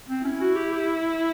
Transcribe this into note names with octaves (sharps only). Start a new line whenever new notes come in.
C4
C#4 E4
F#4
G4
G4